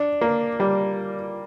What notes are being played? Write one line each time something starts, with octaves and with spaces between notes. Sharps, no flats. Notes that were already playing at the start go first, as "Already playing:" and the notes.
Already playing: D4
A#3
G3